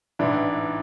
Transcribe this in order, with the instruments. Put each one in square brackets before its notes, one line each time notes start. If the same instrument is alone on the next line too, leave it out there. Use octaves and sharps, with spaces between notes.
[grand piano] A1 G#2 E3 [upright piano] D4 E4